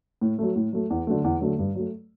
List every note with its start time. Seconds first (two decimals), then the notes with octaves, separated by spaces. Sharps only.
0.21 A2
0.39 F#3 A3
0.56 A2
0.73 F#3 A3
0.90 E2
1.07 D3 F#3 A3
1.24 E2
1.41 D3 F#3 A3
1.59 G2
1.75 F#3 A3